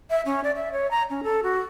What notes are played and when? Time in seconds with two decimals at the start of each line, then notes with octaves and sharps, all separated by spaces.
0.10 E5
0.26 C#4
0.44 D5
0.55 E5
0.72 C#5
0.91 A#5
1.10 C#4
1.23 A4
1.43 F#4